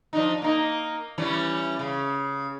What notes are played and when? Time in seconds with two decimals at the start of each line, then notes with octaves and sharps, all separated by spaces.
0.13 F3 D4 D#4
0.42 A#3 D#4
1.18 E3 G3 C#4
1.79 C#3